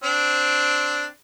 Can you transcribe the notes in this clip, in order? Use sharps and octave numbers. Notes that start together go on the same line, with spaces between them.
C4 D4